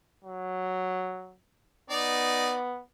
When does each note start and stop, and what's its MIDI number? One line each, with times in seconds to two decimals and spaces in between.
0.25 1.36 54
1.90 2.81 59
1.90 2.55 63
1.90 2.55 74